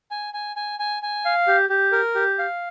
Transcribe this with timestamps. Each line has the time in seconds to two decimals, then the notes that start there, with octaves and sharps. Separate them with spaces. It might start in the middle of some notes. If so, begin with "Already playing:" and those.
0.11 G#5
0.34 G#5
0.56 G#5
0.79 G#5
1.03 G#5
1.25 F5
1.47 G4
1.69 G4
1.92 A#4
2.15 G4
2.39 F5